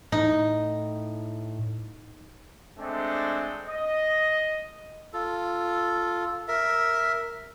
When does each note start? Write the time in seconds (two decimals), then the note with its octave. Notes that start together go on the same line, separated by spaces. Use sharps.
0.12 A2 D#4
2.78 G#3 A3 C4 D4
3.68 D#5
5.13 F4 A4
6.48 A#4 E5